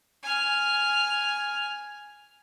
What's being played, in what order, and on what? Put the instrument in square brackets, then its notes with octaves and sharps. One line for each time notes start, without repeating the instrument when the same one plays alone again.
[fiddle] G#5 F6